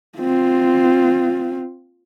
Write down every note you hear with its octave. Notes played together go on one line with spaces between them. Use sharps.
C4 F4